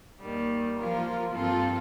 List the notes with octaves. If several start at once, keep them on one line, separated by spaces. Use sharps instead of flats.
D#2 D#3 G3
F3 A#3 F4 A#4
G2 F3 C4 F4 A4